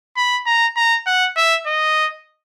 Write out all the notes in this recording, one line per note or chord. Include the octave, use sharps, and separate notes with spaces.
B5
A#5
A#5
F#5
E5
D#5